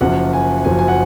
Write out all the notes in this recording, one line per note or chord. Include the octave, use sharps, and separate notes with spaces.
F#1 F#2 F3 F#5
G#5
F#1 F#2 F3 G#5
G#5
F#5